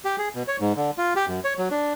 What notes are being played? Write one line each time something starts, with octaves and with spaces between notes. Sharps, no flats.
G4
G#4
B2
C#5
G#2
D3
F4
G4
F#2
C#5
F#3
D4